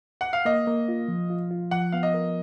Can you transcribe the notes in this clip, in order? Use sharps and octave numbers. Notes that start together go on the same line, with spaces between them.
F#5
F5
A#3 D#5
A#3
F4
F3
F4
F4
F3 F#5
B3 F5
D#5
A#4